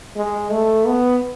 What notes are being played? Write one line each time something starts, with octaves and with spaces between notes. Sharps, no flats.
G#3
A3
B3